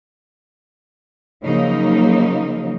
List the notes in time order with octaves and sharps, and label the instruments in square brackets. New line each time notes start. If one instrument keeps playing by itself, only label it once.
[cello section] C#3 F3 F#3 A#3 D#4